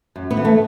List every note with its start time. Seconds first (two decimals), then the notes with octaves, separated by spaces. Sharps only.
0.16 F#2
0.31 B3
0.37 E3
0.45 A3